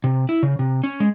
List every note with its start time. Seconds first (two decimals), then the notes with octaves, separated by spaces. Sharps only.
0.04 C3
0.29 E4
0.43 C#3
0.59 C3
0.84 C#4
1.00 G#3